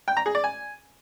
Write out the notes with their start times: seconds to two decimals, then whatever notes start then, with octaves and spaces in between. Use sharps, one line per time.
0.08 G5
0.17 A#5
0.26 G#4
0.35 D5
0.44 G#5